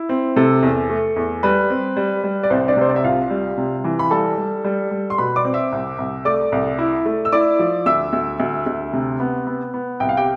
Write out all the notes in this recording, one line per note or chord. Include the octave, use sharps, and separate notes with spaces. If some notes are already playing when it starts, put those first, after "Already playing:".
Already playing: E4
C4
C3 A4
E2
A3
E2
G3 B4
C4
G3
G3
D5
C2 C4 C5
D4 D5
C3 C5
D5
E5
C2 F4 F5
G3
C3
E3
B5
G3 A4 A5
G3
G3
G3
C6
B2 B4 B5
D5 D6
C4
E5 E6
C2
C2
A3 D5 D6
C2
E4
A3
E6
E4 D5 D6
F3
D2 E5 E6
D2
D2
D2
C3
B3
B3
B3
C2 G5
F5
G4 G5